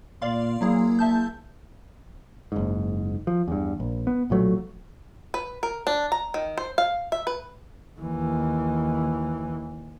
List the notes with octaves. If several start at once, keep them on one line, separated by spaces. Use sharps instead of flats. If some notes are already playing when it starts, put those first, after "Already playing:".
A#2 D5 F5 C6
F#3 A#3 E4 G#4
E5 A5 G6
F#1 G#2
F3
E2 G2
A#1
B3
B1 A#2 F#3 A3
B4
A#4
D4
A#5
D#3
C5
F5
E5
B4
D#2 E3